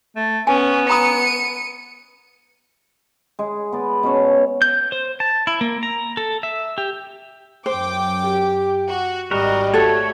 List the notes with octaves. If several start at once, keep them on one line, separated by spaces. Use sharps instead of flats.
A3
B3 C#4 G#5
A#5 B5 D#6 C#7 D#7
G#3 G#4
B3 D5
B2 C#4 C#5 A5
G6
C5
A5
E4
A#3
A#5
A4
E5
G4
F#2 C5 G5 D6
G4
F#4
G#1 G3 F#4 A#4 D#5
A3 F#4 G4 A4 C#5